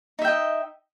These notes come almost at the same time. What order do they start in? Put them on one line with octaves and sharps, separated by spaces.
D#4 E5 G5 D#5